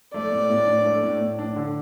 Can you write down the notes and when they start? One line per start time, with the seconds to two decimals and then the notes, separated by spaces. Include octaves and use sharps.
0.14 A3 D5
0.32 A2
0.50 A2
0.67 D4
0.85 A3
1.03 A2
1.20 A2
1.39 D4
1.56 D3